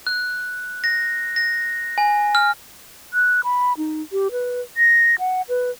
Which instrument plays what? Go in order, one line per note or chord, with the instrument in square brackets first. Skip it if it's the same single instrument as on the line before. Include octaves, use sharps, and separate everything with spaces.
[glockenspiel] F#6
A#6
A#6
G#5
F6
[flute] F#6
B5
D#4
G4
B4
A#6
F#5
B4